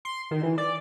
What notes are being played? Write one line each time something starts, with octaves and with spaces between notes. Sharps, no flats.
C6
D#3
E3
D5